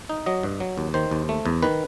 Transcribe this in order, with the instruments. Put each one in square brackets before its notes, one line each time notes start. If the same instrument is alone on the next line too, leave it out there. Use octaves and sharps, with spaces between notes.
[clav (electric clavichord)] D#4
F#3 D#5
G2
F#3
D#2
D#3 C5
D#2
A3
E2
D#3 B4